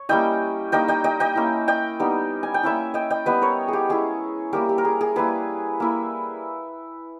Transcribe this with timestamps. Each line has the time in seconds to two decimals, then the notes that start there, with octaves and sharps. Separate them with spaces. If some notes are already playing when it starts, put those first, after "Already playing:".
Already playing: C#5
0.09 G3 A#3 C#4 E4 D#5 G5
0.72 G3 A#3 D#4 D#5 G5
0.88 D#5 G5
1.04 D#5 G5
1.20 D#5 G5
1.36 A#3 C#4 E4
1.68 D#5 G5
2.00 G3 B3 D#4
2.43 G#5
2.54 G5
2.63 A#3 C#4 E4 E5 G#5
2.94 D#5 G5
3.10 D#5 G5
3.26 G3 B3 E4 B4 D#5
3.42 A#4 C#5
3.68 G4 G#4
3.89 G#3 C#4 E4 G#4
4.53 G3 A#3 E4 G4 A#4
4.69 G4
4.78 A#4
4.85 G#4
5.01 G#4
5.16 G3 A#3 E4 G#4 B4
5.80 A#3 E4